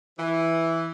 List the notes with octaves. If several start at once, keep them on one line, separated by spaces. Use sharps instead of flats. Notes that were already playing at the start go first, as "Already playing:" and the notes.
E3